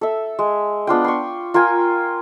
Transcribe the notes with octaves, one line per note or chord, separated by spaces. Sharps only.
A4 E5
G#3
B3 D4 F4 G5
C6 C#6
F4 A#4 G5 G#5